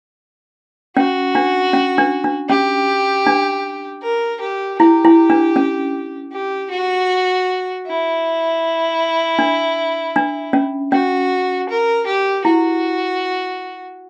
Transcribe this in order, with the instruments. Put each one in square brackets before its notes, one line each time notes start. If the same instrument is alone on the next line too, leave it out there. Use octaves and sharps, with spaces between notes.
[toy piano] C#4 [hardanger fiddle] F#4
[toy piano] D4
C#4
D4
D4
[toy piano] C#4 [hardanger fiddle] G4
[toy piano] D4
[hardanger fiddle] A#4
G4
[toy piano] E4 [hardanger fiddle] G4
[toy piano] E4
D4
C#4
[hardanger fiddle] G4
F#4
E4
[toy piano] D4
D4
C#4
[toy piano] C#4 [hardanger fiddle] F#4
[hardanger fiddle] A#4
G4
[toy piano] E4 [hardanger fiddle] F#4